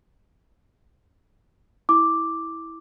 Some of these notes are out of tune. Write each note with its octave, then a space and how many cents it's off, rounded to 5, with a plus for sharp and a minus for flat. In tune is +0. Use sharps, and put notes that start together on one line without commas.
E4 -15 D6 +0